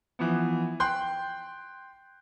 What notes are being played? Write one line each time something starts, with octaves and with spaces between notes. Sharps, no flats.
E3 F3 B3
G5 C6 F#6 G6